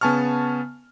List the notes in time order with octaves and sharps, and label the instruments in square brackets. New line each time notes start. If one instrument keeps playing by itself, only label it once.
[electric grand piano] C#3 B3 G#5 A5 C#6 F6